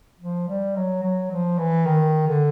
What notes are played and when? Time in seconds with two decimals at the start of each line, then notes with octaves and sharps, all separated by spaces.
0.21 F3
0.49 G3
0.76 F#3
1.03 F#3
1.31 F3
1.59 E3
1.85 D#3
2.27 D3